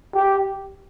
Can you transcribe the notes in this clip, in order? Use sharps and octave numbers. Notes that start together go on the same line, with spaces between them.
G4